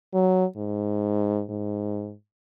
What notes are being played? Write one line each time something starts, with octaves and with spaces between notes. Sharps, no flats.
F#3
G#2
G#2